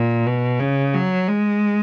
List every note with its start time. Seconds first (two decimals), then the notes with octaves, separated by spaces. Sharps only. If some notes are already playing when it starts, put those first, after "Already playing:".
Already playing: A#2
0.26 B2
0.60 C#3
0.94 F#3
1.28 G#3